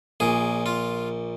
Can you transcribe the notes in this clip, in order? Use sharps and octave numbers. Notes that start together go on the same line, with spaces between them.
A#1 A#2 G#4
F4